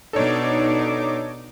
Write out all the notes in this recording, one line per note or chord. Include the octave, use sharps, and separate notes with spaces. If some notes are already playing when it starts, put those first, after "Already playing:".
B2 D4 D#4 A4 C#5 D6